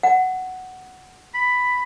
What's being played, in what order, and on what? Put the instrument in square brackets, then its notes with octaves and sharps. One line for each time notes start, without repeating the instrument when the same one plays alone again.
[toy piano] F#5
[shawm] B5